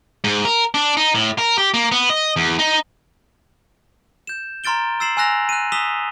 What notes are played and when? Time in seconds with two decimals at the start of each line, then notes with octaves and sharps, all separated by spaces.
0.24 G#2
0.45 A#4
0.74 D4
0.97 D#4
1.15 A2
1.38 A#4
1.58 G4
1.74 A#3
1.92 B3
2.10 D#5
2.36 E2
2.59 D#4
4.27 G6 E7
4.64 A#5 C6 F6 A6 D7 G7
5.00 E6 A6 C7 E7 F#7
5.17 G#5 C6 E6 F#6 A#6 F7
5.49 F#6 D#7
5.72 D#6 E6 B6 E7 F7 G7